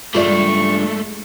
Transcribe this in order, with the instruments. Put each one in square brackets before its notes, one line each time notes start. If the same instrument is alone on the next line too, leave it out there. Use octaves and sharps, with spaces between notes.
[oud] E2 G2 C#3 [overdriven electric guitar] G#3 A3 [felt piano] F4 D5 [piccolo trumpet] C#6